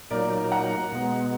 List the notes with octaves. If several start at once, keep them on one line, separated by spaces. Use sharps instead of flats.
A#2 F#3 A#3 D#4 A#4 D5
F#5 A#5
B2 G#3 B3